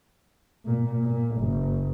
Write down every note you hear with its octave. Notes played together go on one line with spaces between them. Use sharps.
A#2
A#2
F#1